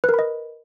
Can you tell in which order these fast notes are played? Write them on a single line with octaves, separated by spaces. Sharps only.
B4 A#4 B5 D#5